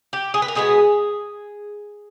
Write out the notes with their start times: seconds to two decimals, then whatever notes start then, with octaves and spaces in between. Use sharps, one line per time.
0.13 G4
0.34 G#4
0.42 B4
0.48 A#4
0.55 B2 G#3 B3 G#4